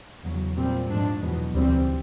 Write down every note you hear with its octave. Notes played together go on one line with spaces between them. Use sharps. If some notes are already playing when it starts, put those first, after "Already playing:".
E2 C#3 F#3
A#2 G3 C4
G#2 F3 A3 D4
E2 B2 F#3 B3
D2 C#3 E3 G3 C4